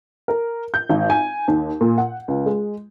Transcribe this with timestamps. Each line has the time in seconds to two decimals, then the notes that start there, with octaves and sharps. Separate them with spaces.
0.28 A#4
0.74 G6
0.89 G#1
1.10 G#5
1.48 D#2
1.81 A#2
1.98 F#5
2.28 C#2
2.46 G#3